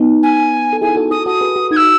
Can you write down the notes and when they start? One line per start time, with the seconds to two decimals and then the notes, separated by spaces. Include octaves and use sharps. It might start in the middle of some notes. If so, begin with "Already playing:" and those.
Already playing: B3 D#4
0.23 G#5
0.73 A4
0.81 E4 G#4 G#5
0.96 F#4 A4
1.11 F#4 A4 D#6
1.26 F#4 A4 D#6
1.41 G#4 B4
1.56 F#4 A4
1.71 D#4 F#4 G#6
1.76 E6